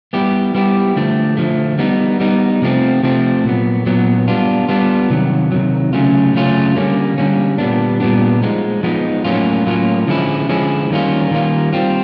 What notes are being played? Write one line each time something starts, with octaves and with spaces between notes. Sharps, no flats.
G3 B3 E4 G4
G3 B3 E4 G4
D3 F3 A3
D3 F3 A3
G3 B3 D#4
G3 B3 D#4
C3 F3 A3 C4
C3 F3 A3 C4
A#2 F#3 B3
A#2 F#3 B3
G3 B3 D4 F4
G3 B3 D4 F4
C3 D#3 F#3
C3 D#3 F#3
C#3 F#3 A3 C#4 F4
C#3 F#3 A3 C#4 F4
D3 G3 A#3 C#4
D3 G3 A#3 C#4
A#2 G3 B3 D4
A#2 G3 B3 D4
F3 G#3 B3 D#4
F3 G#3 B3 D#4
A2 F#3 A#3 C#4 F4
A2 F#3 A#3 C#4 F4
D3 F3 G#3 C#4 E4
D3 F3 G#3 C#4 E4
D#3 G3 A#3 C#4 F4
D#3 G3 A#3 C#4 F4
G3 C4 F4